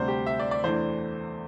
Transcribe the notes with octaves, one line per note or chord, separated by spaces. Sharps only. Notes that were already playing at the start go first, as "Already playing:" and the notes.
Already playing: D2 C3 G3 D4 C5
G4
E5
D5
D5
E2 E3 A3 D4 C5